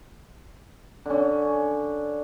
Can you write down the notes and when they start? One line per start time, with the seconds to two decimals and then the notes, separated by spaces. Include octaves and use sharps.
1.06 D3 C#4